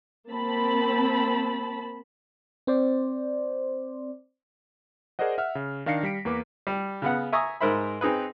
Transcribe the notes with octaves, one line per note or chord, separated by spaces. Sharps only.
A#3 C4 A5 B5
C4 C5 D5
G#4 A#4 C5 D5 D#5 F#5
E5 F#5 F6
C#3
D#3 D4 F5 A#6 C7 C#7
G3 B6 D7
E2 A#3 B4 D6
G3
C#3 B3 F#5
E5 G#5 A#5 C#6 D#6
G#2 A#4 C5 E5 B5
C4 D#4 G#4 B4